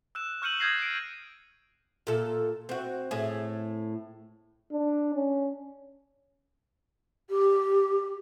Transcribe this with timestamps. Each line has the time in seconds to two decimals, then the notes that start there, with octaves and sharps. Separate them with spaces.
0.15 E6 F#6 E7
0.42 C#6 F6 G6 C#7 D#7 F#7
0.60 D#6 F6 G6 G#6 A#6 C7
0.82 D7
2.07 A#2 A4
2.69 C4 F#4
3.11 A2 G#4
4.72 D4
5.15 C#4
7.29 G4